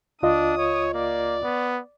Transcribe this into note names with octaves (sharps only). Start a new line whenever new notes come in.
C#2 D4 F4 D#5 D#6
C#5
A#3 D5
B3